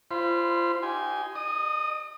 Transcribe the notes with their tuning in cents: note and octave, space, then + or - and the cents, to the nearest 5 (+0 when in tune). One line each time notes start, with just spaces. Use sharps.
F4 -30 C5 +0 B5 +0
D#4 +0 G4 -25 G#5 +0
D#5 -40 D#6 +0